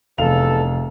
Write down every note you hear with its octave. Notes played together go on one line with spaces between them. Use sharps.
F1 E2 A4 F5 F7